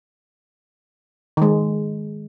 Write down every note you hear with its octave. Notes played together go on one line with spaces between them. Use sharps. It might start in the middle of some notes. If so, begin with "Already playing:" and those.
D#3 G#3